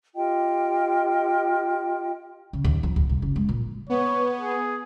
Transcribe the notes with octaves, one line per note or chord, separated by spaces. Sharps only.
F4 G4 D#5 G5
C#3
D#2
F3
D#2
C2
F#1
G#3
A#2
B3 C#5
G#4